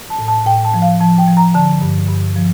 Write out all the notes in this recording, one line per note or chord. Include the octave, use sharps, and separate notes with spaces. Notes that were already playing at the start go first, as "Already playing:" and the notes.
A5
A2
A5
A2 G5
A5
F3
F5
F3 A5
G5
F3
A#5
D3 A5
G2
G2
F3